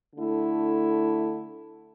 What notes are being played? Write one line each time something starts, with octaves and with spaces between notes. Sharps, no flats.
D3 A3 E4